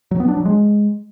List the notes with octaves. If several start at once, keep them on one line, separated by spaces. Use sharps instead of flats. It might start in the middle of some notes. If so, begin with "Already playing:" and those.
F#3
B3
D4
F#3
G#3